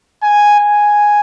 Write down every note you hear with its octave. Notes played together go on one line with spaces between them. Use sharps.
G#5
G#5